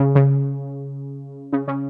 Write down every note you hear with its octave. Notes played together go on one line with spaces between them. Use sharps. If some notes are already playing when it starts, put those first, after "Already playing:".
Already playing: C#3
C#3
C#3
C#3